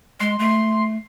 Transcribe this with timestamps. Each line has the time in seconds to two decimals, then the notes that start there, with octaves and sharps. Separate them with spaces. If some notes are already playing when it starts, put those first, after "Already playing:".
0.20 G#3 C6
0.39 A3